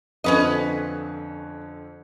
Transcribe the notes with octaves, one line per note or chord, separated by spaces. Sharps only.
F2 D3 C4 C#4 B4 D#5